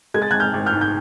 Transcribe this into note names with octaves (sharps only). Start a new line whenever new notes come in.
G#3 G#6
A6
G#1 F#6 G#6
F6 G6
G#1
F6 G6
G#2
G6